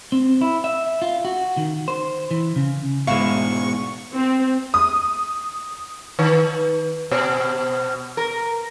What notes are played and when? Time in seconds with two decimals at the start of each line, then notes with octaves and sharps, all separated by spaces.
0.12 C4
0.41 E4
0.64 E5
1.02 F4
1.25 F#4
1.57 D#3
1.88 C5
2.31 E3
2.56 C#3
3.07 G#2 B2 G#3 E4 F5 C#6
4.13 C4
4.74 D#6
6.19 D#3
7.11 B2
8.17 A#4